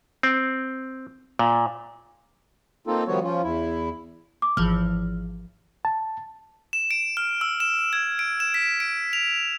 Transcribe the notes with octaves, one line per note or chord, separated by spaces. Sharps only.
C4
A#2
A#3 C4 D#4 F4 A4
D#3 F3 G3 B3 F#4 C#5
F3 C#4 F4
E2 E4
D6
G#1 E3 F3 F6
A5
E7
D7
F6
E6
E7
G#6
D7
E7
B6
D7
F7